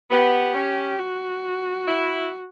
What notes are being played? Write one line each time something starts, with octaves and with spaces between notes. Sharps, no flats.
B3 G4
C#4
F#4
E4